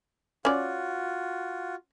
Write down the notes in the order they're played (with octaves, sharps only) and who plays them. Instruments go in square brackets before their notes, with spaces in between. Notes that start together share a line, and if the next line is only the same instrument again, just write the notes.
[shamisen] C#4 D5 [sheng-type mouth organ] F4 F#4